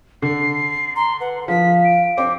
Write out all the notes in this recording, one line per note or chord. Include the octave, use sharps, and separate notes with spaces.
D3 C7
A#5 C6
B4 F#5
F3 F5 B6
D7
C4 D6